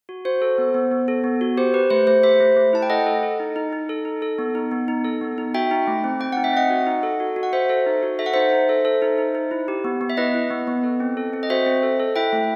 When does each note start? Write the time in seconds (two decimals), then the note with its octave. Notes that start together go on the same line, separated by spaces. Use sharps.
0.09 F#4
0.25 F#4 C5
0.42 A4
0.58 B3
0.74 B3
0.92 B3
1.08 A4
1.24 B3
1.41 F#4
1.57 G4 C5
1.74 G4 B4
1.90 A3 C5
2.07 A3 C5
2.23 G4 C5 E5
2.40 A3
2.57 A3
2.73 E4 A5
2.82 G5
2.90 A4 D#5 F#5
3.06 A4
3.23 A4
3.40 D#4
3.56 D#4
3.73 D#4
3.89 A4
4.05 D#4
4.22 A4
4.39 B3
4.55 D#4
4.71 B3
4.88 D#4
5.05 A4
5.21 B3
5.38 D#4
5.54 F#4 E5 G5
5.71 D#4
5.87 A3
6.04 C4
6.20 C4 G5
6.32 D#4 F#5
6.44 E5
6.53 C4 D#5 F#5
6.70 F#4
6.87 D#4
7.03 A4
7.20 F#4
7.36 F#4
7.43 F#5
7.53 F#4 C5 E5
7.69 A4
7.86 D#4
8.03 F#4
8.19 A4 E5
8.26 F#5
8.34 D#4 C5 E5
8.52 D#4
8.69 A4
8.85 A4
9.02 D#4
9.18 D#4
9.35 D#4
9.51 E4
9.68 G4
9.84 B3
10.01 B3
10.10 E5
10.17 E4 B4 D#5
10.34 E4
10.51 B3
10.67 B3
10.83 A4
11.00 C4
11.17 A4
11.33 C4
11.43 D#5
11.50 F#4 C5 E5
11.66 C4
11.83 A4
11.99 A4
12.16 E4 E5 G5
12.33 A3